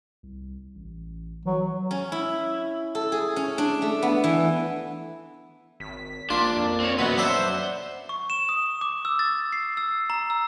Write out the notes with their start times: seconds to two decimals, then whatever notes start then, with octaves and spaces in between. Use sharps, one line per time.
0.23 C2
0.75 A1
1.45 E3 F#3
1.91 C#4
2.12 E4
2.95 A4
3.12 G#4
3.36 C#4
3.58 D4
3.82 A3
4.02 B3
4.24 E3
5.80 G#1 B6
6.30 A#1 A#3 D4 F4
6.56 F2
6.80 C4 C#5
6.99 F#2 B2 B4 F#5
7.18 F#3 D4 C5 E5 F#5
8.09 C#6
8.30 E7
8.49 D#6
8.81 D6
9.05 E6
9.19 A6
9.52 C7
9.77 E6
10.10 A#5
10.30 E6